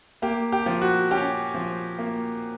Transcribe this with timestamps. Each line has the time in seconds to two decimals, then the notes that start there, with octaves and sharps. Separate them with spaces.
0.22 A#3 G4
0.52 G4
0.66 F3
0.82 F#4
1.11 C#4 G4
1.55 F3
1.99 A#3